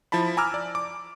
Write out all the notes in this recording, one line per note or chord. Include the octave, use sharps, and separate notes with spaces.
F3 E4 A5 B5
G#5 A#5 D6 E6 F6
D5
D6